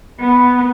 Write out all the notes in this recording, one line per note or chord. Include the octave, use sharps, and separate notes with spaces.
B3